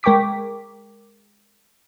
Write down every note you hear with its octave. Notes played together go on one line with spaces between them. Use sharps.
G#3 A#4 G5 C#6 D6 B6